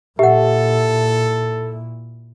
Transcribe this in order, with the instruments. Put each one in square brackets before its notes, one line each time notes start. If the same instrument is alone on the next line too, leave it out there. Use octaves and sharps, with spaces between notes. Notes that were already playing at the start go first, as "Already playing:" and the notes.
[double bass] A#2 E4 [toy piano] G4 F#5 [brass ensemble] A4 [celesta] E5